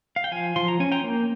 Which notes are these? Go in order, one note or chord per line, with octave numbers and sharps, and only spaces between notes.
F5
G5
F3 F5 G#5
F3 C6
A#5
C#4 G#5
G5 A#5
A#3